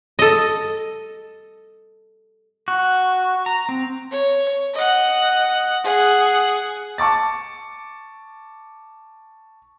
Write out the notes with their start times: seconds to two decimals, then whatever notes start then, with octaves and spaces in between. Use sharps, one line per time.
0.19 A4 D#5
2.68 F#4
3.46 A#5
3.69 C4
4.11 C#5
4.74 D#5 F#5
5.84 G#4 F#5
6.98 A5 C#6 D6 A6